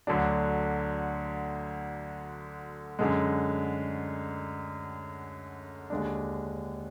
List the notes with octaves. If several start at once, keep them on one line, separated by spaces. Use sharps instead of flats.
D2 D3 F#3 D4
F#2 D3 G#3
D#2 D3 G#3 D4